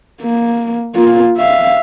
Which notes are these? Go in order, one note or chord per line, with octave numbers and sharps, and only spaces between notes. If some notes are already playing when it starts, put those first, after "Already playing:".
A#3
A#3 F4
E5 F5